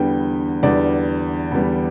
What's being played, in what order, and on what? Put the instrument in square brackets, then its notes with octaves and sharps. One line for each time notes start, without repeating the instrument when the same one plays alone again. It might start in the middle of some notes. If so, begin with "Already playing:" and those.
Already playing: [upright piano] E2 D3 G3 B3 G5
E2 D3 G3 B3 D5
E2 D3 G3 B3